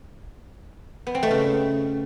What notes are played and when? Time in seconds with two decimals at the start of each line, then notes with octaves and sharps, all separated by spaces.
1.07 B3
1.15 C4
1.23 A3
1.31 C#3